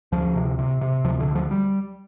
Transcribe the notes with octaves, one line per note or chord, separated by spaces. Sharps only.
D2 F3
C3
C3
C3
D2 F3
D3
D2
F3
G3